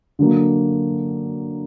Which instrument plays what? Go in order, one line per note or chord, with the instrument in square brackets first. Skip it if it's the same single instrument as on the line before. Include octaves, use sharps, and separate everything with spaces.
[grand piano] D3 F#3 A#3